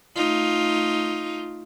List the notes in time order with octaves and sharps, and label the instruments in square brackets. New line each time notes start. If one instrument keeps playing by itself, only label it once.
[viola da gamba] A3 D#4 F4